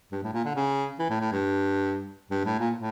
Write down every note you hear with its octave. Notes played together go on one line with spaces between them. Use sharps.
G2
A2
A#2
D3
C#3
E3
A2
A2
G2
G2
A2
A#2
A2